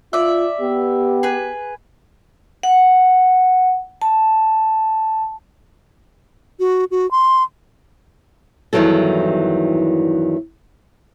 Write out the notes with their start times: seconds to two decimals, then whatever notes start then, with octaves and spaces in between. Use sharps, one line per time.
0.13 F4 D5 E5
0.60 B3 G4
1.23 G#4 B4
2.63 F#5
4.02 A5
6.60 F#4
6.91 F#4
7.11 C6
8.73 E2 G2 D#3 E3 F#3 A4